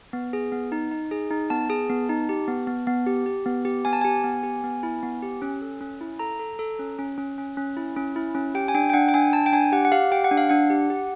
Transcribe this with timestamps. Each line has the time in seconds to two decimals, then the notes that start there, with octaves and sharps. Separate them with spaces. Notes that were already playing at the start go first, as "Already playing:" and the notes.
0.13 B3
0.33 G#4
0.52 B3
0.72 D#4
0.91 D#4
1.11 G#4
1.31 D#4
1.50 B3 A5
1.70 G#4
1.90 B3
2.09 D#4
2.29 G4
2.48 B3
2.67 B3
2.87 B3
3.06 G4
3.26 G4
3.46 B3
3.65 G4
3.85 B3 G#5
3.93 A5
4.01 G4 G#5
4.24 B3
4.43 G4
4.64 B3
4.83 E4
5.03 B3
5.22 G4
5.42 C#4
5.62 A4
5.81 C#4
6.01 E4
6.19 A4 A#5
6.39 A4
6.59 A4
6.79 C#4
6.99 C#4
7.18 C#4
7.38 C#4
7.57 C#4
7.77 E4
7.97 C#4
8.16 E4
8.35 C#4
8.55 G4 G5
8.68 G#5
8.75 D4 G5
8.90 G5
8.94 D4 F#5
9.09 G5
9.14 D4 G#5
9.33 D4 A5
9.46 G5
9.52 D4 G#5
9.72 G4 F#5
9.85 F#5
9.92 G4 F5
10.11 G4 G5
10.24 F#5
10.31 D4
10.37 F5
10.49 D4 F#5
10.70 G4
10.90 G4